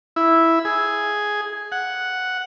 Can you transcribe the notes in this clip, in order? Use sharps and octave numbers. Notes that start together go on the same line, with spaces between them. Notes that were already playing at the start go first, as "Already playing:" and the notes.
E4
G#4
F#5